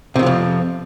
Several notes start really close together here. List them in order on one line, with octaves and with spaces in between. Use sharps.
C3 D#3 F3 F2